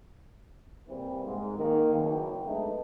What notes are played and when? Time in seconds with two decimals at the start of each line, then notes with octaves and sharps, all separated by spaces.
0.89 C3 E3 G3 A#3 C4
1.25 G#2
1.58 D#3 A#3
1.94 F#1 C2 F#2 B2 B3 G5
2.45 G#3 A3 B3 D4 D#4